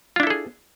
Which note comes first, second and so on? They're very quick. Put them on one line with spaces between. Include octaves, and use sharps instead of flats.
F4 D4 E4 A4 G#4